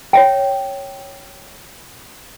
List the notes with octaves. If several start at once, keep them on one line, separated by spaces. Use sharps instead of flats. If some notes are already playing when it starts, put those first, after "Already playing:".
C#5 E5 G5